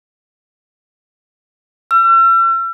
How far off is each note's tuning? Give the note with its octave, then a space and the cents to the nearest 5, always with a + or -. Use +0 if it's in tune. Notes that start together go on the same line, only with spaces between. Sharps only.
E6 +45